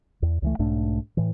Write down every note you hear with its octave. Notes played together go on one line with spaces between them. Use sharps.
E2
C#2 E3 A3
B1 G#2 A3 D4
A2 E3